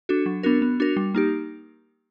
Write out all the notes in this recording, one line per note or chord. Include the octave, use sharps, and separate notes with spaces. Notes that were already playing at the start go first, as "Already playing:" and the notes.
D4 F#4 A4
F#3
B3 D4 F#4 A#4
B3
D4 F#4 A#4
G3
A#3 D#4 G4